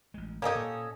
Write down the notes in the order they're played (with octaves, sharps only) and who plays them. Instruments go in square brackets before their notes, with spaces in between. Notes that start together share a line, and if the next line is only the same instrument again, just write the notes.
[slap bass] A1 G#3
[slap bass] G2 [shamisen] A#3 G4 [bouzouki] C#4 A4 D#5
[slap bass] A#2